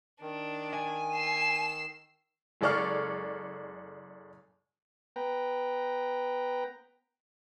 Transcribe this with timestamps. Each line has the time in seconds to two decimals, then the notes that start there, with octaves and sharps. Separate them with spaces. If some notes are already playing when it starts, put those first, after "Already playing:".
0.21 D#3 D4
0.74 G#5
1.13 E6 C7
2.61 F#1 G#3 A4 D5 C#6 F6
5.16 B3 B4 G5 A#5